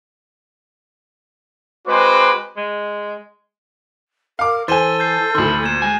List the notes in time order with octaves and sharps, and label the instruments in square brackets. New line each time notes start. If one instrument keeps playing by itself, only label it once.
[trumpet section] G#3 C4 F#4 B4 C5 D6
[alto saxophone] G#3
[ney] A#4 [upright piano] F5 D6
[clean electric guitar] E3 [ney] A4 [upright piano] C5 G#5 [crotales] A6 D#7 G7
[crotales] G6 A6 C7
[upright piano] D2 C6 [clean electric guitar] D#3 E4
[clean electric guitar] A#2 [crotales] G#6 E7
[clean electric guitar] G#3 G#5